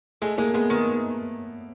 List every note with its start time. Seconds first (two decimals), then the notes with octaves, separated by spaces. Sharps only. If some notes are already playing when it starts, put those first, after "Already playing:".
0.22 G#3 A3
0.38 G#3 A#3
0.54 G#3 B3
0.70 D#3 B3